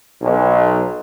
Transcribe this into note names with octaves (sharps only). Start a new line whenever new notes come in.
B1